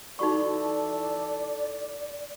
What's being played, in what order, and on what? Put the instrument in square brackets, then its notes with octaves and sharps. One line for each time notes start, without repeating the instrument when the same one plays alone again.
[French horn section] E3 E4 A4 [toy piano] D#4 F#4 C#6 [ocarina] D5